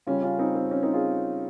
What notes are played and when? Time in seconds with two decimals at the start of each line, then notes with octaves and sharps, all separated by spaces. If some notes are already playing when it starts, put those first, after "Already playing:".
0.07 C#3 G3 C#4 F4
0.23 C#4 F4
0.39 C4 D#4
0.55 C4
0.71 C#4
0.83 C4 D#4
0.93 F4 G#4